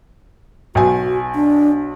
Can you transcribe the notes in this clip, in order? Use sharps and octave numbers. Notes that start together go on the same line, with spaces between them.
B1 F#4 G#5
D4